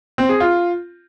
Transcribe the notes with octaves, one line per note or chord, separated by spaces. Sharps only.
C4
G#4
F4